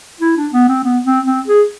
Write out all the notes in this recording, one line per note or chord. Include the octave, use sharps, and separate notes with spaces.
E4
D4
B3
C4
B3
C4
C4
G#4